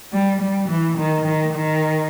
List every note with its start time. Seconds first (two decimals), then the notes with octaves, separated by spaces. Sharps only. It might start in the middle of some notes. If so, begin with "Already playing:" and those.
0.12 G3
0.40 G3
0.69 E3
0.98 D#3
1.25 D#3
1.53 D#3